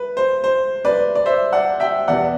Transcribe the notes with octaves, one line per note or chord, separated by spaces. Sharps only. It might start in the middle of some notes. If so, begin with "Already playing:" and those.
Already playing: B4
C5
C5
B4 D5
D5
C5 E5
D5 F#5
E5 G5
E2 B2 G3 B3 D5 F#5